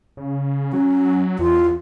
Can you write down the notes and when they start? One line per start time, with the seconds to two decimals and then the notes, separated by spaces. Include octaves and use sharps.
0.17 C#3
0.73 F#3 C#4
1.39 E2 F4